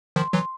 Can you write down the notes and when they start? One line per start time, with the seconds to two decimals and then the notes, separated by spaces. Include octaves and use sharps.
0.16 D#3 F3 C6
0.33 E3 F#3